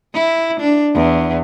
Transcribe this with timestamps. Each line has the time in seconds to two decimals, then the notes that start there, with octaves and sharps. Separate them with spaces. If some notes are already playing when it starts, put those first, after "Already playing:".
0.14 E4
0.60 D4
0.94 E2